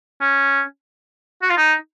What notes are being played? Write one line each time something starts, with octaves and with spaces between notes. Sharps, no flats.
C#4
F#4
F4
D#4